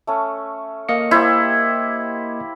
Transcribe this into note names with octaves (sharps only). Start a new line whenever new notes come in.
A3 C#4
A#3 D#5 F5 C#7
E4 G4 A#4 C5